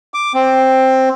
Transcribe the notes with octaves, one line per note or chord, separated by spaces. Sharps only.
D6
C4